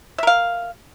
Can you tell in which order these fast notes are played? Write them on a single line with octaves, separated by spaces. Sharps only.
E5 A#4 F5